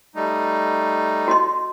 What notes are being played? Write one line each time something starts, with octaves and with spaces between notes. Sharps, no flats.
G3 A3 D#4
F#4 D#5 C6